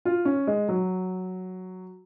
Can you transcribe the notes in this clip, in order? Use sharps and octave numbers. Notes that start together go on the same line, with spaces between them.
F4
C#4
G#3
F#3